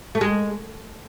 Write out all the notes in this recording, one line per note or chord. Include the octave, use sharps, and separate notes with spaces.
A3
G#3